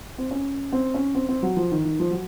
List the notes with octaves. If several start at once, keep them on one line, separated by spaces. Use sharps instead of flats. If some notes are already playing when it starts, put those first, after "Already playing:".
C4
C#4
C4
C#4
C4
C4
F#3
F3
D#3
D#3
F3
F#3